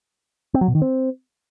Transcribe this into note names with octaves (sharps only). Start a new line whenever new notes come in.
C4
F#3
B2
D#3
C4